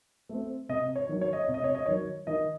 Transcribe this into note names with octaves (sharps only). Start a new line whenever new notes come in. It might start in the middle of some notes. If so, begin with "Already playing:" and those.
A3 C4
C3 D#5
C#5
D#3 F#3
C#5
D#5
C#5
C3
D#5
C#5
D#5
D#3 F#3 C#5
D#3 D#5